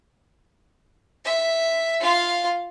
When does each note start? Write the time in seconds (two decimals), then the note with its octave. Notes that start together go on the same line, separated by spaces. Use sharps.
1.25 E5
2.00 F4 F5